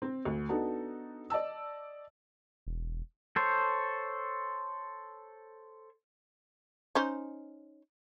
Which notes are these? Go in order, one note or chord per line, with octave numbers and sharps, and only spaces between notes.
C4
D2
B3 D4 D#4 F#4 A4
D5 D#5 A5 E6
E1
A4 C5 C#5
C#4 D#4 C5